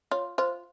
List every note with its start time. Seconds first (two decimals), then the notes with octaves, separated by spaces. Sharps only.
0.11 F4 C#5
0.38 F4 C5